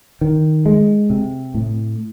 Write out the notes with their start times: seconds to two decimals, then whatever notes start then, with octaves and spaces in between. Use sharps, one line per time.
0.21 D#3
0.66 G#3
1.10 C3
1.54 A2